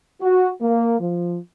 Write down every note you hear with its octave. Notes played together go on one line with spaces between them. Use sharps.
F#4
A#3
F3